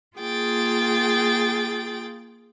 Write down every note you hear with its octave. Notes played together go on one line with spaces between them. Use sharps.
A#3 F4 G#4 G5 A6